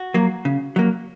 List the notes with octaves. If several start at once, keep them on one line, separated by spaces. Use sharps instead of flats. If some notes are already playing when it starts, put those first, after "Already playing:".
Already playing: F#4
F#3 A#3
C#3
F#3 A#3